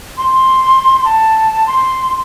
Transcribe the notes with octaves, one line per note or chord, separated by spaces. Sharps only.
C6
A5
C6